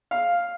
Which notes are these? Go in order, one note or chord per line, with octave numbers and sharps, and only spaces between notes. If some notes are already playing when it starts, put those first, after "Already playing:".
F5